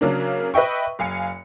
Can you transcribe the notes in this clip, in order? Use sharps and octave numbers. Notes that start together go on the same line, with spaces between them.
C#3 F#3 A#3 D4
B4 D#5 E5 G5 C#6
F#1 F5 G#5 C#7